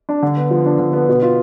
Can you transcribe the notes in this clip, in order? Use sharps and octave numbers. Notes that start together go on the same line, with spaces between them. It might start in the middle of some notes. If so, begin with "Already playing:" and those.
D4
D3
B3
F3
D4
D3
B3
B2
F4